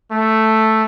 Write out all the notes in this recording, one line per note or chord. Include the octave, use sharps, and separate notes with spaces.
A3